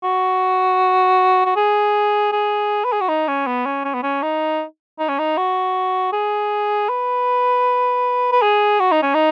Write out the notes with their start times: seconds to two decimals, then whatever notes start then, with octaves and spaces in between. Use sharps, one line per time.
0.03 F#4
1.45 F#4
1.56 G#4
2.32 G#4
2.85 B4
2.93 G#4
3.01 F#4
3.09 D#4
3.28 C#4
3.47 B3
3.66 C#4
3.85 C#4
3.94 B3
4.03 C#4
4.22 D#4
4.99 D#4
5.08 C#4
5.19 D#4
5.37 F#4
6.13 G#4
6.89 B4
8.32 B4
8.42 G#4
8.80 F#4
8.92 D#4
9.02 C#4
9.14 D#4